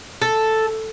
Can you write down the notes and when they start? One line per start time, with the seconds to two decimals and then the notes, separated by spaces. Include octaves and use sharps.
0.22 A4